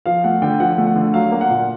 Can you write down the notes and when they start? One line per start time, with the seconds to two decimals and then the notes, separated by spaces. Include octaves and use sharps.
0.06 F3 F5
0.24 A3 F#5
0.42 D3 G5
0.60 F3 F#5
0.78 A3
0.87 F#5
0.96 D3
1.14 F#3 F5
1.32 A#3
1.41 F#5
1.50 A#2